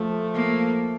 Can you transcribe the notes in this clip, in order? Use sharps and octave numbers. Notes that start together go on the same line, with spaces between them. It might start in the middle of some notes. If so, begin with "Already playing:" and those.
Already playing: F3 A3
A#3